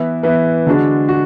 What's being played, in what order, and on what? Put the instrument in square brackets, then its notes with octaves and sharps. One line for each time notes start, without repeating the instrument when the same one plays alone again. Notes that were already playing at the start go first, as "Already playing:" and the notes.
Already playing: [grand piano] E3 B3 E4
E3 B3 E4
D3 G#3 D4 F#4
F#4